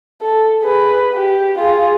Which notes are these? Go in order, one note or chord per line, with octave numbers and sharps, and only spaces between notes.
A4
G#4 B4
G4
F4 G#4